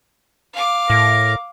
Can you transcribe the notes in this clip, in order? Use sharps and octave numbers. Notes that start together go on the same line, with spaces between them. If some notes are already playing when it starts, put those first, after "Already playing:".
F5 D6
A2 A#4